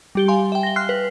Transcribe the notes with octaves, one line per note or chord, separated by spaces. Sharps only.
G3 G4 G7
F5 G#5 C6
E5 G5
A#6 G7
C6 F6 F#6 C7
B4